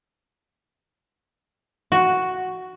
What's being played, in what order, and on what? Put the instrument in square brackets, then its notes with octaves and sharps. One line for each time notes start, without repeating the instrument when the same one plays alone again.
[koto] F#4